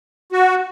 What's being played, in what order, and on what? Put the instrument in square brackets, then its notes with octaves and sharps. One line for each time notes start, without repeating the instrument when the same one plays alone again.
[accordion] F#4